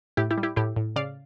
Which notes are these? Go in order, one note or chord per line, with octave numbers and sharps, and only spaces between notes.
A2 E4 G4
E4 G4
G3
E4 G4
A2 E4 G4
A2
C#3 D5 F5